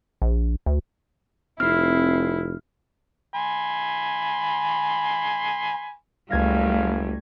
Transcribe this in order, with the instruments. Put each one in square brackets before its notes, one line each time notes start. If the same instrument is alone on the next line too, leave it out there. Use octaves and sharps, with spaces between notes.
[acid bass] A#1
D2
[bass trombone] F1 [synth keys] C4 C7 [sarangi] E4 [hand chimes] F6
[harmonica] G#5 B5 C6
[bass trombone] F#1 [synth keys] C#2 G#6 A#6 [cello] G3 A3 [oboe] F5